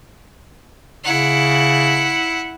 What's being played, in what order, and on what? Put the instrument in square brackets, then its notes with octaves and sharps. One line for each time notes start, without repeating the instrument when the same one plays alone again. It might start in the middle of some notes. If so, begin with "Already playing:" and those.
[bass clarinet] C#3 [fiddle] E4 F#5